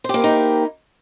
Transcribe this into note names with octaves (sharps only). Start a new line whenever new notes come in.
A#3 D#4 E4 G4 C5